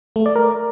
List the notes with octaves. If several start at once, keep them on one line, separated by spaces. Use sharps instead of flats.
A3
D5
A#4